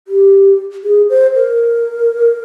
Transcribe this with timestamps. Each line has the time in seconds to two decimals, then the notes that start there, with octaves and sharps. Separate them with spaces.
0.08 G4
0.84 G#4
1.09 C5
1.35 A#4